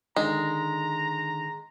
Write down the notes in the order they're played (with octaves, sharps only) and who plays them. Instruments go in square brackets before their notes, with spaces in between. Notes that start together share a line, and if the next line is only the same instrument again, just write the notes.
[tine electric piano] D3 D#3 [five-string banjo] G#3 [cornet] A#5